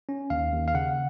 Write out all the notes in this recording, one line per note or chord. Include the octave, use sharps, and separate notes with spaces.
C#4
D#2 F5
D#2
F5
C#3 F#5